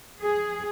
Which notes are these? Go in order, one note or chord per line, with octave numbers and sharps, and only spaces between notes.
G#4